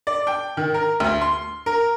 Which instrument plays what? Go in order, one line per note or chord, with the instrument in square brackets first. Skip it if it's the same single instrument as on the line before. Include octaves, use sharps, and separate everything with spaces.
[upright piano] D5
G5
D#3
A#4
D2
C6
A#4